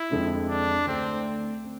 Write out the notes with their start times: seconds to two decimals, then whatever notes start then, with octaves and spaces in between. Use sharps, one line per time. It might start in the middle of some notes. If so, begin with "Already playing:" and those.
Already playing: E4
0.10 F2 D3 G#3 C4
0.49 D4
0.87 D2 D3 A3 C4 D4
1.64 C4